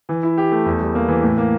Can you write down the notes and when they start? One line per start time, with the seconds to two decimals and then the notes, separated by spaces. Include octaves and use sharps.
0.09 E3
0.23 E4
0.38 G4
0.52 A3
0.66 E2
0.80 G3
0.95 A#3
1.08 E3
1.23 A2
1.38 A#3